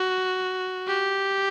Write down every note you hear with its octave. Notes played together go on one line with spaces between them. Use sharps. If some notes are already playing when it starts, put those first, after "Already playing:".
Already playing: F#4
G4